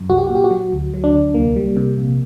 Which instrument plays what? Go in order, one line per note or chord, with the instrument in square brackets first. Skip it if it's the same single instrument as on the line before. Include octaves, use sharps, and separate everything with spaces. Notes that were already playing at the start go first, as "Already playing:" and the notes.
Already playing: [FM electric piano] F#2
C2 F#4
G4
A#2 F#4
G4
F#4
F#3
D2
F#3
D4
D2
C2 A#3
G3
C3
A#1